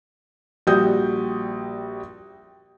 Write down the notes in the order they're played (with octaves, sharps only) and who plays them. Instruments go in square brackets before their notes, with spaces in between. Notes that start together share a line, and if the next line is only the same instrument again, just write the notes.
[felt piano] A#1 G3 F#4 D#6 G6